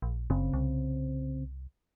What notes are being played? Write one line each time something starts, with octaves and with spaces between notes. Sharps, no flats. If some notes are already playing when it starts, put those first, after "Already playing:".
A#1
F#1 C#3 C4
C2